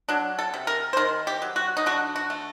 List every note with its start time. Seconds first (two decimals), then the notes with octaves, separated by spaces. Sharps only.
0.09 F#3 D4
0.39 A4
0.54 C3
0.67 A#4
0.93 C5
0.97 D#3 A#4
1.27 G4
1.42 F#3
1.56 F#4
1.77 D#4
1.86 D3 F#4
2.16 F#4
2.30 A3